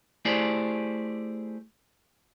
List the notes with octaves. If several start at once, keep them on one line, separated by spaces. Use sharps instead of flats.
A3 E4 G4 G#4 C5 D5